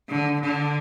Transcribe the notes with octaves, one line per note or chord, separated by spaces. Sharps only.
D3
D3